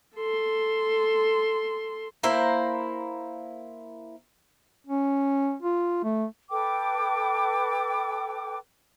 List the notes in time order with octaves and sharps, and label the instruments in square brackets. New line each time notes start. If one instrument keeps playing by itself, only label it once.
[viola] A4 C6
[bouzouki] A#3 E4 C5
[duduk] C#4
F4
A3
[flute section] A4 B4 G5 D6